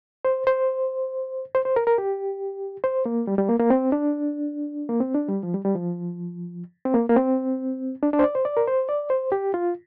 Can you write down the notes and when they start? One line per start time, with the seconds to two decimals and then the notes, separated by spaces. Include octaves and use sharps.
0.25 C5
0.47 C5
1.55 C5
1.65 C5
1.76 A#4
1.87 A#4
1.98 G4
2.84 C5
3.06 A#3
3.27 G3
3.38 G3
3.49 A#3
3.60 A#3
3.70 C4
3.92 D4
4.89 A#3
5.00 C4
5.15 D4
5.28 G3
5.43 F3
5.54 G3
5.65 G3
5.75 F3
6.85 C4
6.94 A#3
7.09 A#3
7.16 C4
8.03 D4
8.13 D4
8.19 C5
8.24 D5
8.35 C5
8.45 D5
8.57 A#4
8.67 C5
8.89 D5
9.10 C5
9.32 G4
9.54 F4